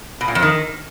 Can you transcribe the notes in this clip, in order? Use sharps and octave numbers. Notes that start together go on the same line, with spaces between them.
B2
A#2
F2
D#3